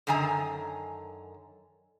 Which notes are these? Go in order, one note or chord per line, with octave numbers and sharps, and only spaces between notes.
F#2 D3 D#3 G#5 A#5